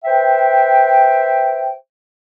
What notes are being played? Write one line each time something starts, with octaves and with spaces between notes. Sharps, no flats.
B4 C5 E5 G5